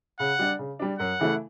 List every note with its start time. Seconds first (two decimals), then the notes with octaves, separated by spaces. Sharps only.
0.19 C#3 F#5
0.39 G3 D4
0.59 C#3
0.79 G3 D4
0.99 F#2 F#5
1.19 C#3 E3 A3 E4